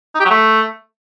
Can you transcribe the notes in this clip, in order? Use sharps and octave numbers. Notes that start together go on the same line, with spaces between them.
D#4
G4
F#3
A3